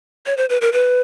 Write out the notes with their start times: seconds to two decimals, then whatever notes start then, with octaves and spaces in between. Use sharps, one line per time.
0.26 C#5
0.37 C5
0.49 B4
0.61 A#4
0.73 B4